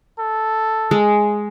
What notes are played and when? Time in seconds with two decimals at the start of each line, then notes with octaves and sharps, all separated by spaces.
0.19 A4
0.91 G#3